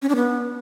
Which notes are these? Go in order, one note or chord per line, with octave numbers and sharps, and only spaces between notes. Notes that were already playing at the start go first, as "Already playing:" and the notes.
C#4
D4
B3